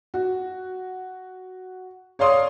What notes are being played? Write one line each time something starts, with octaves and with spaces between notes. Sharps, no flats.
F#4
C#5 D5 F5 C6 D#6